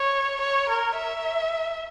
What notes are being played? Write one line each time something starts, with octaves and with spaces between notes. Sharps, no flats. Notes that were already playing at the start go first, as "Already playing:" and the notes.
Already playing: C#5
C#5
A#4
E5